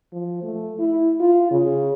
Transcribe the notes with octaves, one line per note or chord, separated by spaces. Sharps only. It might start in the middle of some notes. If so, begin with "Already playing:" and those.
F3
A3
E4
F4
C#3